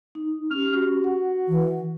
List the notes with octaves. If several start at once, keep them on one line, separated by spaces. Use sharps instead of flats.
D#4
C#4 G4 F6
F#4
F#5
E3